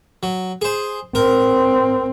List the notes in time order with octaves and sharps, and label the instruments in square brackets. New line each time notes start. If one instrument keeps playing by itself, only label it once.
[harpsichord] F#3
G#4 C5
[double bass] C4 [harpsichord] A#4